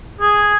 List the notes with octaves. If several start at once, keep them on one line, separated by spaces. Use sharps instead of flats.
G#4